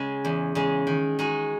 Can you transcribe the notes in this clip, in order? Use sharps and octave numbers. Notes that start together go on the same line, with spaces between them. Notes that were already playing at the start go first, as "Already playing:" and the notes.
Already playing: C#3 G#3
E2
C#3 G#3
D#3
G#3 D#4 F#4